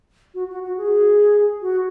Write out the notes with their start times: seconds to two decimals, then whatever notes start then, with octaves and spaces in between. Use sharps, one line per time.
0.35 F#4
0.49 F#4
0.64 F#4
0.77 G#4
1.62 F#4